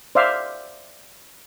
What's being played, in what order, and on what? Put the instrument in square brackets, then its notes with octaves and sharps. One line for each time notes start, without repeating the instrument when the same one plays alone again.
[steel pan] C5 D5 E5 F5